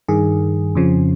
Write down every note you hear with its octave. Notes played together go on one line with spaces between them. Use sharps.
G2 D#3 G#4
F2 C#3 F3